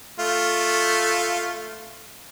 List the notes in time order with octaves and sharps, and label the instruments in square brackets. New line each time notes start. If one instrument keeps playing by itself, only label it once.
[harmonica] A3 F4